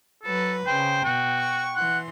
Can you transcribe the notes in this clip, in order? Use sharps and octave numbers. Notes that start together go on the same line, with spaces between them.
F#3 A4 B4
C#3 C5 G5
B2 F#4
C#6
E3 F#5 C6